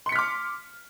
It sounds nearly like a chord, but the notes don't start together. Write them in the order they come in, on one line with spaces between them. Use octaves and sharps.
C6 C#7 B6 F6 D6